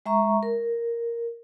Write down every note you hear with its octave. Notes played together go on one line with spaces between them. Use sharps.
G#3 E5 A#5 C#6
A#4